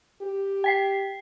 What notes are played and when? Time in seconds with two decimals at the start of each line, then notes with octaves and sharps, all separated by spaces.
0.21 G4
0.64 G5 B6 C7